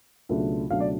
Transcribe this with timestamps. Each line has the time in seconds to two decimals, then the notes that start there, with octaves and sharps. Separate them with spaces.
0.29 C#2 B2 F#3 A3 D4
0.70 C#2 B2 F#3 A3 D4 F5
0.80 D5